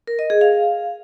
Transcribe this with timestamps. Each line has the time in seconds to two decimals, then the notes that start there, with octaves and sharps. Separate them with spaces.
0.07 A#4
0.19 D#5
0.30 G#4
0.41 F5